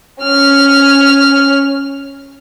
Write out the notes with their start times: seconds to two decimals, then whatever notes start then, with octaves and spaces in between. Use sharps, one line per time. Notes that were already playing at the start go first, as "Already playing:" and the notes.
0.22 C#4 F6